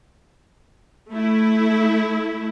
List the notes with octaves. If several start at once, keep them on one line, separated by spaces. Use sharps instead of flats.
A3 E4